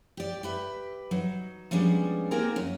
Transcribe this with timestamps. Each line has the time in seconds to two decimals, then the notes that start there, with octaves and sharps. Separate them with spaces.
0.17 G4 D5
0.43 G4 B4 E5
1.11 F#3 D#4
1.71 F3 G3 G#3 B3 C#4 D4
2.31 A#3 C4 D#4 G4 G#4 A#4
2.56 F#2 C#4